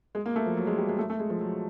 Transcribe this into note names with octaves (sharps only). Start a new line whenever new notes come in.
G#3
A#3
A3
F3
F#3
G#3
G3
G#3
A3
A3
G#3
F3
F#3